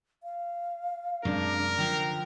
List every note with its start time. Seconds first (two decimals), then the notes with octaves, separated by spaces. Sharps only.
0.23 F5
1.25 F#2 C3 G#3 D4 A#4
1.78 D3 F3 G5